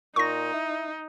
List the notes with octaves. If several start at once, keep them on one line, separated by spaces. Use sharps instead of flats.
A#2 D#4 C#6 A#6
E4